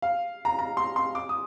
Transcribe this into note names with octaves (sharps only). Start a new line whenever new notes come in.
F5
A#5
A#5
C6
C6
D6
D#6